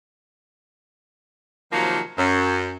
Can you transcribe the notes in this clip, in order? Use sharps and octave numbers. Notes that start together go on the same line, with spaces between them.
C3 D#3 F3 F#3 A#3
F#2